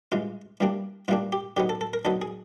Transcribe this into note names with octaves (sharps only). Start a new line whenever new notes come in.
G2 E3 G#3 F4
G2 E3 G3 A#3 D4
G2 E3 G3 A#3 D4 F4
G4
D3 F#3 B3 D#4 G4
A4
A4
A#4
D3 F#3 B3 D#4 A4
G#4